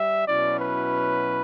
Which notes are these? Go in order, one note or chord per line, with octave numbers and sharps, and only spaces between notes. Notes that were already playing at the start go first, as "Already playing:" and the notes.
Already playing: G3 E5
B2 F#3 C#4 E4 D5
B4